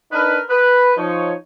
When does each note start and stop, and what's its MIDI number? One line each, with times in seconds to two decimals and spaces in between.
0.12 0.39 62
0.12 0.39 63
0.12 0.39 70
0.12 0.39 71
0.50 0.92 71
0.97 1.33 53
0.97 1.33 63
0.97 1.33 73